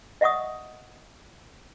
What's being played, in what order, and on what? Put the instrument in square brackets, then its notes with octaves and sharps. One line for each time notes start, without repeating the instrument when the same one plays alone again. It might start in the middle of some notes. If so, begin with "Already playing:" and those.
[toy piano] D#5 E5 F#5 C#6 D#6